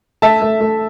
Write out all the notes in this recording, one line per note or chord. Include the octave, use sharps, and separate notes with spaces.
A3 E5 A5
A3
A3